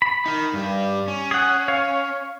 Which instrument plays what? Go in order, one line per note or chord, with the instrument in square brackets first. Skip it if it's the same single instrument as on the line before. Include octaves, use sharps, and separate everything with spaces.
[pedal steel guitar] B5
[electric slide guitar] D#4 A#4
G2 G3
C#4
[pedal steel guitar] G#4 F#5
C#5 F5